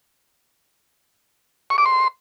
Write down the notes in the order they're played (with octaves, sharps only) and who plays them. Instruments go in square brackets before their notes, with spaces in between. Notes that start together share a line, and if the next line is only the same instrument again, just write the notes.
[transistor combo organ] C#6
D6
C6